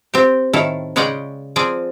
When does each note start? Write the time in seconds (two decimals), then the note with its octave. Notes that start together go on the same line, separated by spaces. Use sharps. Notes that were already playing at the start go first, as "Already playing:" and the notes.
0.14 C4 G4
0.53 A2 D#3 E4 A4 F5
0.96 C#3 G#3 C#4 D5 F#5 G5
1.56 F3 C4 G#4 D5